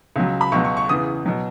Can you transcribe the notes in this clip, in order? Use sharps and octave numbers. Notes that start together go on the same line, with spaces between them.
C#2 C#3 F#3
B5
C#2 B2 F#3 C#6
C#6
C#6
E2 C#3 E3 D#6
B2 F#3